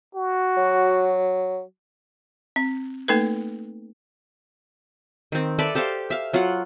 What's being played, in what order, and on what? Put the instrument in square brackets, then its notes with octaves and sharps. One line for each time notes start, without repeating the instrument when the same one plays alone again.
[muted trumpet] F#4
[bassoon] F#3
[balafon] C4
A3 A#3 D#4 A4 B4
[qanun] D#3 C4
A4 B4 D5 E5
G4 A4 C5 F5
E5 F5
F#3 F4 F5 F#5